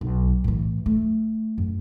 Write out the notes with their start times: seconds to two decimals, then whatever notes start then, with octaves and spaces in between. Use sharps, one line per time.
0.01 B1
0.44 A2 E3
0.86 A3
1.58 F#2